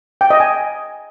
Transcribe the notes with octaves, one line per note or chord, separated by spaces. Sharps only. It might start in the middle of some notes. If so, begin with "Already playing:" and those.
G5
D#5
G#5